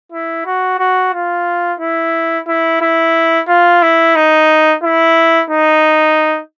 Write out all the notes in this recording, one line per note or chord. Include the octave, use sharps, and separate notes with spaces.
E4
F#4
F#4
F4
E4
E4
E4
F4
E4
D#4
E4
D#4